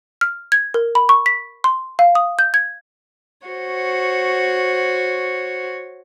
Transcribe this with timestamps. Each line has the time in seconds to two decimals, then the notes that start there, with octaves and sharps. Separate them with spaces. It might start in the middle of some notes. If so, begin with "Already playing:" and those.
0.21 F6
0.52 G#6
0.74 A#4
0.95 B5
1.09 C#6
1.26 B6
1.64 C6
1.99 F5
2.15 D#6
2.39 G6
2.54 G#6
3.47 F#4 C5 C#5